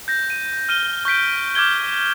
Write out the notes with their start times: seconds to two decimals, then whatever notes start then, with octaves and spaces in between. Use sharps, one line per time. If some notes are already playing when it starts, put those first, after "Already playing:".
0.08 G6 A#6
0.30 D#7
0.69 F6 D#7 G7
1.05 C#6 G6 B6 D7
1.55 D6 F6 G6 G#6 G7